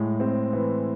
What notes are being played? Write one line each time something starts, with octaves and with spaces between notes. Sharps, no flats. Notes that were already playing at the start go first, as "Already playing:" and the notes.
Already playing: A2 G#3
C4
E3